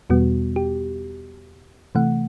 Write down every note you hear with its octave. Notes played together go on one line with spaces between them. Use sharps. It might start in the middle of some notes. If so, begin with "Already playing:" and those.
E2 B2 G3 B3 F#4
G4
C3 E3 A3 F#5